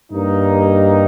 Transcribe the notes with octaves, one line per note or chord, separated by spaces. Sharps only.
G2 G3 A#3 D#4